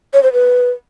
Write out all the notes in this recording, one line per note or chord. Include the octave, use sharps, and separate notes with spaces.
C#5
C5
B4